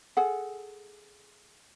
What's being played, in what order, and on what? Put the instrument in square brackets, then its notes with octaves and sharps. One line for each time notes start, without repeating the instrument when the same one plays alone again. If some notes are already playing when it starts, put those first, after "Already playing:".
[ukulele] G#4 A4 F#5